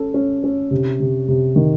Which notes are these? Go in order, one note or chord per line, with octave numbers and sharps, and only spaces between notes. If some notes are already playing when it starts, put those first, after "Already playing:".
Already playing: C#4 A4
C#4
C#4
C3
C3
C3
D#3